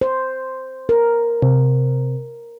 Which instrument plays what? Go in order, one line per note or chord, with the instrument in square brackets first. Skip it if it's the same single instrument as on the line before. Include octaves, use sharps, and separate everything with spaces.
[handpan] C5
A#4
[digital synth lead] C3